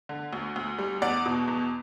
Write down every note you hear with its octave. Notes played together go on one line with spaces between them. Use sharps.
D3
D2
D2
G3
E2 D5 F#5
B2
E2